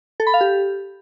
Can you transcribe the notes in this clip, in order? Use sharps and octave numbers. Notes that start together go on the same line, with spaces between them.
A4
B5
F5
G4